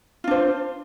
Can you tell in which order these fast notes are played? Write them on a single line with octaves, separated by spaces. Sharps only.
F4 D4 C5